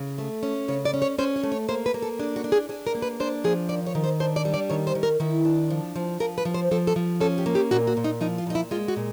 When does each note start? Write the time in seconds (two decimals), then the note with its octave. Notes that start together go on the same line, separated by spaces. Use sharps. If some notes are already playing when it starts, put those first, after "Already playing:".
Already playing: C#3
0.18 A3
0.43 C#4
0.68 C#3 C#5
0.85 D5
0.94 C#4
1.02 C#5
1.18 C#4 C5
1.36 C#5
1.43 A3
1.52 C#5
1.69 A#3 C5
1.86 B4
1.94 A#3
2.02 A4
2.19 D4 G#4
2.36 F#4
2.44 D4
2.52 G#4
2.69 D4 G#4
2.87 A#4
2.95 A#3
3.02 B4
3.20 D4 C5
3.44 F3 G#4
3.69 D#3 D5
3.87 C#5
3.95 D#3
4.04 C5
4.20 D4 C5
4.36 D5
4.45 G3
4.54 D5
4.70 D#3 C#5
4.87 C5
4.95 D#3
5.03 A#4
5.20 D#3 E4
5.45 D4
5.70 F3
5.96 F3
6.20 F3 A#4
6.38 B4
6.45 F3
6.54 C5
6.71 F3 A4
6.87 A4
6.96 F3
7.20 C#4 A4
7.38 G4
7.46 A#3
7.55 G4
7.71 A#2 F#4
7.87 F#4
7.97 A#2
8.04 D#4
8.21 F3 D#4
8.38 F4
8.46 A#2 D#4
8.55 E4
8.71 G#3 F4
8.88 F#4
8.97 A#2